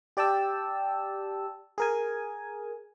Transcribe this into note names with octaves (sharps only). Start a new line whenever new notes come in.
G4 D5 G5 A5 E6
G#4 A#4 G#5